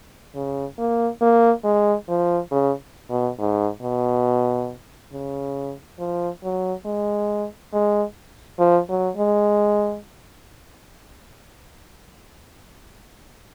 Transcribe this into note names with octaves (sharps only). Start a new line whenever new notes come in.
C#3
A#3
A#3
G#3
F3
C#3
B2
G#2
B2
C#3
F3
F#3
G#3
G#3
F3
F#3
G#3